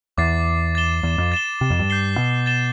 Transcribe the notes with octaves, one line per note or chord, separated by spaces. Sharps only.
E2 D6 A6 C7
A6 E7 G7
E2
F2
A6 E7 G7
C3
F2
G2
G6 C7 G7
B2
A6 E7 G7